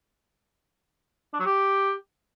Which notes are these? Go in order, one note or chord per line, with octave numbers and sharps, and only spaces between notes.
D4
F#3
G4